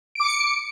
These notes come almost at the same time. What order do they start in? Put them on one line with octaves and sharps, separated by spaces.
D7 D6 C#7